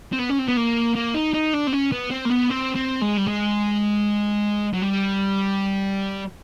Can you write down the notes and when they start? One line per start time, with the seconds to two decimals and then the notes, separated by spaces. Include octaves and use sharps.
0.12 C4
0.19 B3
0.29 C#4
0.39 C4
0.47 B3
0.56 A#3
0.96 A#3
1.15 D#4
1.34 D#4
1.54 D4
1.67 C4
1.73 C#4
1.92 B3
2.11 C4
2.26 A#3
2.30 B3
2.50 C4
2.76 C4
3.02 G#3
3.18 G3
3.27 G#3
4.73 F#3
4.82 G3